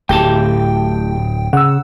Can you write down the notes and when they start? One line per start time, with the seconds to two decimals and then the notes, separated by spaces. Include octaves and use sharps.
0.09 D1 A2 G4 G5 A5
1.53 C#3 F#5 E6